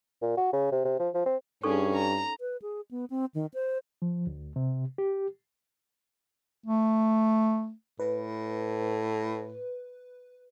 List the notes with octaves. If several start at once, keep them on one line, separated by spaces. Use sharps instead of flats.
A#2
F#4
C#3
C3
C3
F3
F3
C4
G2 C#4 D#4 G#4 A4 C#6
A#5
B4
G#4
B3
C4
D#3
C5
F3
D2
C3
G4
A3
A2 B4